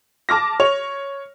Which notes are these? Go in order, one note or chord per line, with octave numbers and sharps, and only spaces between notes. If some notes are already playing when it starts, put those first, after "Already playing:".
A5 D6 F6 A#6
C#5 F7